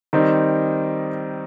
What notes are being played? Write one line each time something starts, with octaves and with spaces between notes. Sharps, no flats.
D#3 G3 C4 D#4